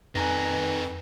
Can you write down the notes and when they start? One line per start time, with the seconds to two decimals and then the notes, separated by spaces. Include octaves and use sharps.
0.15 F2 D#3 B4 F#5 G#5 A#5 A#6